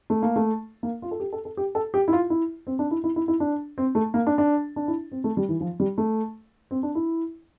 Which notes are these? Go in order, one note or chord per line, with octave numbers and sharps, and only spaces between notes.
A3
A#3
A3
A#3
F4
A4
G4
A4
A4
G4
A4
G4
E4
F4
E4
C4
D4
E4
E4
E4
E4
D4
C4
A3
A#3
D4
D4
D4
E4
C4
A3
G3
E3
F3
G3
A3
C4
D4
E4